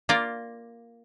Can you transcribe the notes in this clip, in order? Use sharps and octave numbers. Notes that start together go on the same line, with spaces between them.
A#3 F4 D5